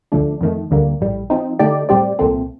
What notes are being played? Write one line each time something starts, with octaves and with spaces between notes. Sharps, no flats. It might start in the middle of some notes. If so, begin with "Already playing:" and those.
D2 D3 F3 A3 D4
F2 D#3 A3
D2 D3 G3 A#3
A#1 A2 G3
F3 C4 D#4
D3 A3 D#4 G4 D5
A2 G3 C4 G4 D5
C2 A#2 A3 C4